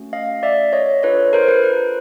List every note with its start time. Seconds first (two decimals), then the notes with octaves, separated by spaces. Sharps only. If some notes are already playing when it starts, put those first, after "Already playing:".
Already playing: A3 C#4 F#4
0.13 D#5 F5
0.43 D5 E5
0.73 C#5 D#5
1.03 D4 F4 A4 B4 C#5
1.33 A#4 C5
1.48 B4
1.63 B4